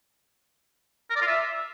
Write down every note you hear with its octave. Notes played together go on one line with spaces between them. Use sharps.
A#4
D5
F4
E5